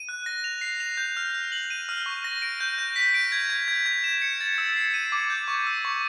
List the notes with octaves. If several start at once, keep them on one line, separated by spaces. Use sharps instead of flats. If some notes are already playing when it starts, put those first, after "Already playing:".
Already playing: D#7
F#6
A#6
F7
C7
F7
G6
F6
F6
F#7
D#7
F6
C#6
A#6
D7
G6
G6
B6
D7
G#6
G#6
G#6
G#6
E7
C#7
A6
E6
C7
D#7
D6
G6
C#6
E6
C#6